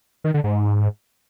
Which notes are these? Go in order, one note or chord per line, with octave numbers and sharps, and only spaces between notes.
D#3
D3
G#2